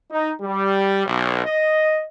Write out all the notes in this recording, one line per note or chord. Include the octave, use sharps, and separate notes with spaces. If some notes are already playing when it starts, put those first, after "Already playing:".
D#4
G3
B1
D#5